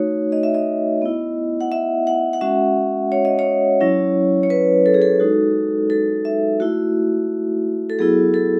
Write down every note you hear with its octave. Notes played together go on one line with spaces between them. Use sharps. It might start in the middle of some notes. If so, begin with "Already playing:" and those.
Already playing: A3 D#4 F#4 C#5
D#5
E5
D#5
B3 E4
F#5
E5
F#5
F#5
G#3 C#4 F#4 E5
C#5
D#5
C#5
F#3 C#4 E4
C#5
B4
A4
G#4
A4
G#3 D#4 F#4
A4
E5
A3 E4 F#4
A4
F#3 B3 E4 G#4
A4